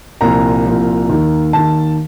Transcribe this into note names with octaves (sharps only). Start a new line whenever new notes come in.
C2 A#2 F3 A#5
C2 A#2 F3
D#2 D#3
D#2 D#3 A5